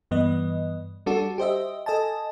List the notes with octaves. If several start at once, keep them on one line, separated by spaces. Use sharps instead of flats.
G2 E3 B3 D#5
G3 D4 F#4 A4
G4 C5 D#5 E5
A4 D#5 G#5 A5